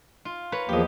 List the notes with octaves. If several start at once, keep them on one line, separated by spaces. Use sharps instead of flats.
F4
B4 C#5 A#5
E2 F3 A#3 G4 D#5